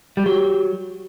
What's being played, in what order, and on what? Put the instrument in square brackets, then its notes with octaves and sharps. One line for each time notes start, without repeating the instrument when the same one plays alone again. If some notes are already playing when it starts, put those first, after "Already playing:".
[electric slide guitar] G3
[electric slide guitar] F#3 [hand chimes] G4